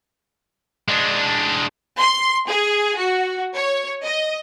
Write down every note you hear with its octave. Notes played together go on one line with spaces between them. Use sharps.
G#3 D4
C6
G#4
F#4
C#5
D#5